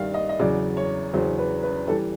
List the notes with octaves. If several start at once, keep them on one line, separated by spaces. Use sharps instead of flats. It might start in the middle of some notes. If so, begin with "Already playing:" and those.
Already playing: G2 D#3 G3 F5
D#5
D#5
E2 C#3 F#3 D5
C#5
E2 C#3 F#3 C5
B4
B4
E3 G3 A4